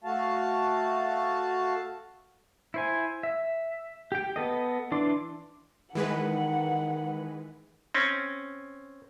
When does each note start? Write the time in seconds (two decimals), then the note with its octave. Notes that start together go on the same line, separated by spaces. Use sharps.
0.04 A3 F#4 F5 A5
2.74 E4 C5 G#5
3.23 E5
4.12 G4 G5
4.36 B3 A4 D#5
4.92 E3 D4 D5 C6 D6
5.95 D#3 E3 G#3 B4 F#5
7.94 C4 C#4